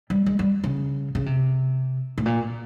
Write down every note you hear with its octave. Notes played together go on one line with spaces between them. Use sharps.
G3
G#3
G3
C#3
C#3
C3
A2
A#2